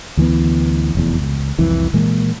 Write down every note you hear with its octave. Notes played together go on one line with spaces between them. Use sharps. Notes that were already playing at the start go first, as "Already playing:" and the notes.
D2 E3 G#3 B3
F1 E2
C#2
C2 F2 E3
A#2 E3 G#3 A#3